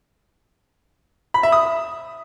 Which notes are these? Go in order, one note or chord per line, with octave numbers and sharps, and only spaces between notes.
B5
E5
D#6